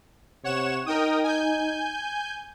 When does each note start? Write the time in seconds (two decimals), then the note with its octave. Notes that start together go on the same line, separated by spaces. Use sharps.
0.44 C3 C#5 F#5 E7
0.86 D#4 A#4 G5 D#6
1.24 G#5 G6